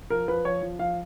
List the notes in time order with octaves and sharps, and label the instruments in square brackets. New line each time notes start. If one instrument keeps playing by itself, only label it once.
[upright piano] F3 A#4
F3 B4
F3 C#5
F3
F3 F5